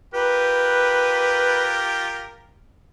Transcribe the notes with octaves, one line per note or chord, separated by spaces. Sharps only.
F4 G4 A#4 B4